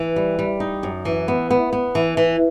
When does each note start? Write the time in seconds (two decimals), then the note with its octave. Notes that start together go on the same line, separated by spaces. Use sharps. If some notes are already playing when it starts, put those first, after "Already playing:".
Already playing: E3
0.16 G3
0.39 G3
0.60 D#4
0.83 F#2
1.05 E3
1.28 B3
1.51 B3
1.73 B3
1.95 E3
2.17 E3